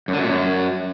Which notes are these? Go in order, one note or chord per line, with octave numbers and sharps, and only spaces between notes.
F#2
D3
F#2
A#2
F#2